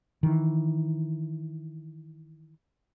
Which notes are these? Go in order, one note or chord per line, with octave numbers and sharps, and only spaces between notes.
D#3 E3